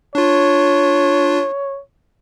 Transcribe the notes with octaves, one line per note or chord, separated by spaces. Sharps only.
D4 F4 C#5